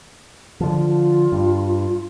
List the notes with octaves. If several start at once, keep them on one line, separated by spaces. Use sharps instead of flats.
D3 F3 F4
G2